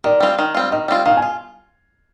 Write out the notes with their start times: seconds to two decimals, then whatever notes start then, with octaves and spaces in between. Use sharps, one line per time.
0.04 D#3 D5
0.20 G3 C4 F4
0.39 D#3
0.55 G3 C4 F4
0.71 D#3 D#5
0.88 G3 C4 F4
1.06 D#3 F5
1.17 G#5
1.22 F4